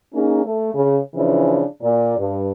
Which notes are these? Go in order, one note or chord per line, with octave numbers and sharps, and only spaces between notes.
A#3 C#4 D#4 G#4
A3
C#3
C#3 E3 F3 D4
A#2 D5
G2